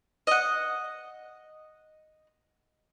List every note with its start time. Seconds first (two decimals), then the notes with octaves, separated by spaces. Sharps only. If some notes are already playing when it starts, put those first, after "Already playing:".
0.27 D#5 F#5